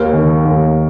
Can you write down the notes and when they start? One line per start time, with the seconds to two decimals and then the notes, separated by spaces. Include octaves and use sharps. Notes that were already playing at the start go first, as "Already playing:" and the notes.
Already playing: D#2 A#4
0.13 D#3
0.45 D#2